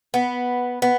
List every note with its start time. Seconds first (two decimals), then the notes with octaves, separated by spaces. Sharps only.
0.14 B3
0.82 B3